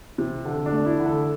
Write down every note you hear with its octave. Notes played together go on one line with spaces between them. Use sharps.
C3
D3 A4
D4
A3
E4
D3
A4